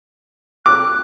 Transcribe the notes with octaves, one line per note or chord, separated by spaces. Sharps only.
D6 F#6